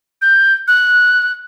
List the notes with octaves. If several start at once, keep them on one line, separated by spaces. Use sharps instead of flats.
G6
F#6